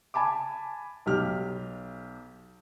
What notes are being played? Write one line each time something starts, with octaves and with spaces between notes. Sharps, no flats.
G#5 A5 B5 D6
B1 G4 F6